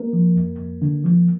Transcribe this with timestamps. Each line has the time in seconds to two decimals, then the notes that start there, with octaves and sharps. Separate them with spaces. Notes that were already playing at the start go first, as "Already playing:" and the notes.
Already playing: A#3 A#4
0.13 F3
0.36 F2
0.59 F2
0.82 D3
1.04 F3